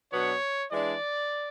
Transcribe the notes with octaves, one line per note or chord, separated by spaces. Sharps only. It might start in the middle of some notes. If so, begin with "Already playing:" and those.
B2 F#3 B3 D4 C#5
E3 G#3 D4 D5